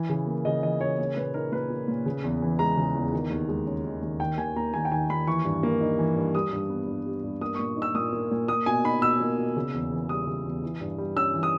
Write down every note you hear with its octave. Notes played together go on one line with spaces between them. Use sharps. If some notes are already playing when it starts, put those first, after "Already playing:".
Already playing: E3
C#3
A#3
C#3 D#5
E3 D#5
C#3 C#5
A#3 C#5
A#2 B4
D#4 A#4
A#2 B4
A#3
A#2
C#3
E2
E3
G#3 A#5
C#3
E2
D#3
D#2
G#3
C#4
D#3
D#2
D#3 G5
D#2 G#5
A#3 A#5
D#2 G#5
G5
D#3 G#5
D#2 B5
E3 C#6
G2
A#3
D#4
E3
G2
G3 D#6
G2
B3
G2
G3
G2
A#3 D#6
A#2 C#6
D#4
E6
A#2 D#6
A#3
A#2
A#3 D#6
B2 G#5
D#4 B5
B2 E6
A#3
B2
C#3
E2
E3
G3 D#6
C#3
E2
E3
G2
G3
C#4 E6
E3
D#6